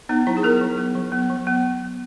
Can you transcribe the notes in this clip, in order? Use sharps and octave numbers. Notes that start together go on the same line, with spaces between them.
B3 D#4
F#3 E4
G#4
B3 A#4
F#3
B3
F#3
B3
F#3
B3